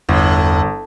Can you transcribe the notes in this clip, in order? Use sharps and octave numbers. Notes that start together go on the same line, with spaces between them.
G1 E2 A2